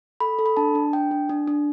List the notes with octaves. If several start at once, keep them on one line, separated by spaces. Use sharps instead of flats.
A4 B5
A4
B5
D4 A5
D4
D4 G5
D4
D4
D4